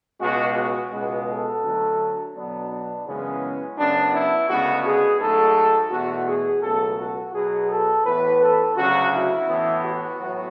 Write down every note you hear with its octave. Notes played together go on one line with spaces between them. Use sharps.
C#2 B2 G#3 F#4
F#4
C#2 B2 G#3 B3
A4
D2 D3 F#3 A3
B2 F#3 B3 D4
D4
F#2 C#3 E3 G#3 B3 C#4
F#2 C#3 F#3 B3 D4
E4
D2 C#3 G#3 B3 F#4
G#4
G#2 F#3 A3 A4
E2 B2 A3 F#4
G#4
C#2 B2 F#3 A3 A4
F#4
B2 F#3 B3 G#4
A4
A2 E3 B3 B4
A4
D2 C#3 F#3 F#4
E4
A2 E3 B3
F#4
A2 F#3 B3